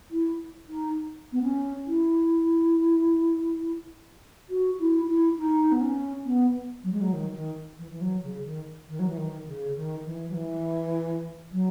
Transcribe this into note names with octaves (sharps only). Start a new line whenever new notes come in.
E4
D#4
B3
C#4
E4
F#4
E4
E4
D#4
B3
C#4
B3
F#3
G#3
F#3
D#3
D#3
E3
E3
F#3
C#3
D#3
D#3
F#3
E3
D#3
C#3
D#3
E3
F#3
E3
F#3